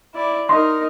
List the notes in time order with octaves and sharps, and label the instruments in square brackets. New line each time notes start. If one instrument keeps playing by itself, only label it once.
[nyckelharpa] E4 D5
[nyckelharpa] D#4 A#4 [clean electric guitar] D#5 C6